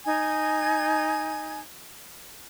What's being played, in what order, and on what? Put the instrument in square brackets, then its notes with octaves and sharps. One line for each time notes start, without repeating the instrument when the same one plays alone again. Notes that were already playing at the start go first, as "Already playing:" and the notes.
[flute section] D#4 G#5 G#6